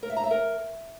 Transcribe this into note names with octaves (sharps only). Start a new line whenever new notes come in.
A#4
E5
A#5
E5
A#4